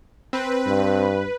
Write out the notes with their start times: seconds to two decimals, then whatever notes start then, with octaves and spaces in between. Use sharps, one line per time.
0.33 C4 B4
0.67 G2